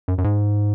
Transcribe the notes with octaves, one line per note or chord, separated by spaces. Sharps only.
F#2
F#2
G#2